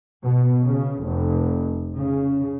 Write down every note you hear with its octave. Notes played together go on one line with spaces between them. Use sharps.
B2
C#3
F1
C#3